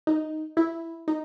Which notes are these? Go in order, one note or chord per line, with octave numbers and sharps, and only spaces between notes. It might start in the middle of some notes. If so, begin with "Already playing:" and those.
D#4
E4
D#4